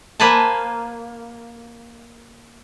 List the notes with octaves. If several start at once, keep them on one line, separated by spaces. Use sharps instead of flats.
A#3 B4 C5 G#5 A5